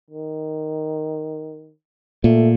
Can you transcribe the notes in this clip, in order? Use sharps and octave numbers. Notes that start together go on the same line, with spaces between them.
D#3
A#2 A3